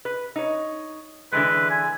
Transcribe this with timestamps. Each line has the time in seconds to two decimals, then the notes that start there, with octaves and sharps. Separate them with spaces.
0.05 B4
0.36 D#4 C#5
1.32 D3 E3 G#3 B4
1.70 G#5